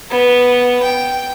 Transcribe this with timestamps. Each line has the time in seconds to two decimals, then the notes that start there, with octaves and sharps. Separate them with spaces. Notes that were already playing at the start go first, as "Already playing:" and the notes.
0.10 B3
0.82 G5